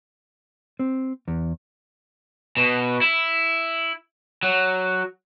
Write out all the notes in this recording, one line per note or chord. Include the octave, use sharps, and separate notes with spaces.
C4
E2
B2
E4
F#3